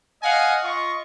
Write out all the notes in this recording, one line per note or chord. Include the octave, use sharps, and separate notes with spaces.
D#5 F5 F#5 G#5
F4 D#5 C#6